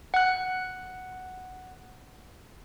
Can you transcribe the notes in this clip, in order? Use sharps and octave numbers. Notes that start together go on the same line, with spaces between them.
F#5 F#6